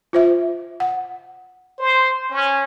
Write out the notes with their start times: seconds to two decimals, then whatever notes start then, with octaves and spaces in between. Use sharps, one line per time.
0.13 F4 C5 E5
0.80 F#5
1.79 C5
2.30 C#4